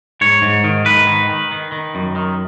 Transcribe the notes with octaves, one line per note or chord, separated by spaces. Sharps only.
G#2 C#5
G#2
D#3
G#2 B4
D#3
D#3
D#3
D#3
F#2
D#3